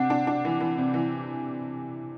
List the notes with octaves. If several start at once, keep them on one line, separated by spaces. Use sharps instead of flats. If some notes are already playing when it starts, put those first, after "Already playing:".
Already playing: C3 D4 F#5
D4
D4
E3
E3
C3
E3